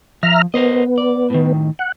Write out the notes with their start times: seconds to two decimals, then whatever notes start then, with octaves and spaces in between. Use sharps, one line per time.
0.23 F3 E5 A#5 F6
0.54 B3 A#4 C5 D#5
0.98 D5
1.30 A2 D#3
1.79 F#5